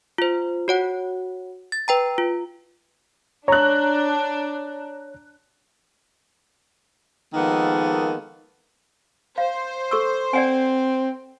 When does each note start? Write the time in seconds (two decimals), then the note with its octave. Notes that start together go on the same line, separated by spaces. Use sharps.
0.18 F4 C5
0.68 F#4 C#5 F#5
1.72 A6
1.88 B4 G5 A#5
2.18 F4
3.48 D4 C#5 A#5 F#6
7.34 D#3 F3 G#3 A#3 B3 A4
9.38 C5 F5
9.91 A4 C#6 E6
10.33 C4 D5 F#5 G#5